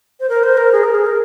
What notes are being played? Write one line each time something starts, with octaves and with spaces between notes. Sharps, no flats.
C5
A#4
C5
A#4
G#4
A#4
G#4
A#4